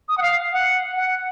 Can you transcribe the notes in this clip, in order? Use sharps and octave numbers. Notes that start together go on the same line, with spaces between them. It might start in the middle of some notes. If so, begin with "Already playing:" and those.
D#6
F#5
F5
F#5
F#5